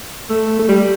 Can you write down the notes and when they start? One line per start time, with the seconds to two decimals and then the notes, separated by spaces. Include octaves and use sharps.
0.30 A3
0.59 A3
0.68 G3